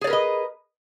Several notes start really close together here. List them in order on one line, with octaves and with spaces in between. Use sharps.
G#4 D5 A#4 B4 D#5